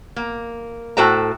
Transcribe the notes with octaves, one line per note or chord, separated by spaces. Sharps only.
A#3
A2 F#4 A4 C5 G5 A#5